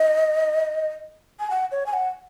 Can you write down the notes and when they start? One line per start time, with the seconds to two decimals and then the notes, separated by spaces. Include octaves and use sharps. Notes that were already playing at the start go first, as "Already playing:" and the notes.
Already playing: D#5
1.40 G#5
1.50 F#5
1.72 C#5
1.86 G#5
1.93 F#5